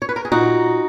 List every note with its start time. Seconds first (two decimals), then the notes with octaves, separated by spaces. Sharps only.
0.02 C#5
0.09 B4
0.16 A#4
0.25 G#4
0.32 A#2 D#4 F#4